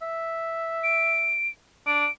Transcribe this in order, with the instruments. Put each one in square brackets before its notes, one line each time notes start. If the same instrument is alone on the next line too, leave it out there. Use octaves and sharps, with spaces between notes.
[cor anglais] E5
[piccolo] D7
[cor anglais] D4 [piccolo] D7